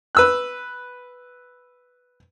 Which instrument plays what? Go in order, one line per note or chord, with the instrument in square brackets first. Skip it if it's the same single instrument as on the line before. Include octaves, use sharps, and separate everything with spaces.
[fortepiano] B4 E6 F#6